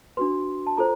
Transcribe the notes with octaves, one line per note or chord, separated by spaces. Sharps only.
D4 F#4 B4 C6
A5
F4 A4 C5 A#5